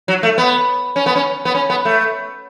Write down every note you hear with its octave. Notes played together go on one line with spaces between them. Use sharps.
F#3
A3
B3
C#4
B3
C#4
B3
C#4
B3
A3